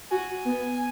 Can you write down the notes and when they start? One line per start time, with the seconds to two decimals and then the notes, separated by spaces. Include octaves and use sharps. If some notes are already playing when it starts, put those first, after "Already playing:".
0.11 F#4 G#5
0.45 B3